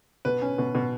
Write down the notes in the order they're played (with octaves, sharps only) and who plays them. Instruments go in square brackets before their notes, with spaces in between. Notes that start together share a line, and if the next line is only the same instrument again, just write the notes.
[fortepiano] B2 [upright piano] B4
[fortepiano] C#4
B2
B2